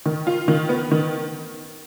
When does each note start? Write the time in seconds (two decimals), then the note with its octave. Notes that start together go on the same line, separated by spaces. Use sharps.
0.06 D#3
0.27 F4
0.48 D#3
0.69 B3
0.91 D#3